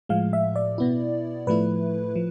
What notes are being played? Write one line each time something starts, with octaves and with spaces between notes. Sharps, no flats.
A2 F3 G#3 F5
E5
D5
B2 B3 E4
A2 F3 A3 E4 B4
F3